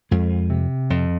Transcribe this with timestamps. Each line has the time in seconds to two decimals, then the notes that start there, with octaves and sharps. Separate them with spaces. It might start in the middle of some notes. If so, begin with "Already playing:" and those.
0.11 F2 G#3
0.50 C3
0.90 F2